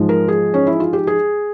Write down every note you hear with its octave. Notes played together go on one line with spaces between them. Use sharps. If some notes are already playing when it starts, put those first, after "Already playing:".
Already playing: G#2 F3 G#3
A#4
G#4
C#4
E4
F4
G4
G#4